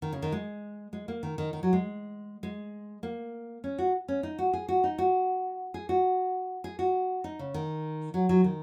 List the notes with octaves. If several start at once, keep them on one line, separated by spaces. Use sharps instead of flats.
D#3
C#3
D#3
G#3
G#3
A#3
D#3
D#3
D#3
F#3
G#3
G#3
A#3
C#4
F#4
C#4
D#4
F#4
G#4
F#4
D#4
F#4
G#4
F#4
G#4
F#4
D#4
C#3
D#3
F#3
F#3
D#3